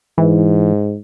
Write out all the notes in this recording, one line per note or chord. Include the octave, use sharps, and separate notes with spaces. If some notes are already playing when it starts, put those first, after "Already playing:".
G#2 E3